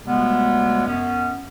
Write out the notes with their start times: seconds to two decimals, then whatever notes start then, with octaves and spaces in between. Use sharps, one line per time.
0.06 D2 C3 G3 G#3 B3
0.85 F#2 B3 C#4